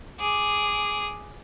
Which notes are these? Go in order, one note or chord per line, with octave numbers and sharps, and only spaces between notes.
G#4 D6